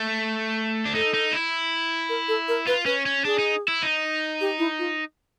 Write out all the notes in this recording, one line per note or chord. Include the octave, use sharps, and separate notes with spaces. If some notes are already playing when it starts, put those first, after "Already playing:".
Already playing: A3
D4
D#4 A4
D#4
E4
A#4
A4
A#4
F4 B4
C#4 B4
C#4
D4 G#4
D#4
E4
D#4
G4
E4
F4